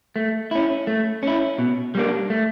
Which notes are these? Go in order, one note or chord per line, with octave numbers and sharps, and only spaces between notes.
A3
C#4 E4
A3
C#4 E4
B2
G3 A#3 D4
A3